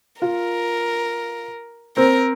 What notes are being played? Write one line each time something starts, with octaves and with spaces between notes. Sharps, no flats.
F4 A#4
C4 A#4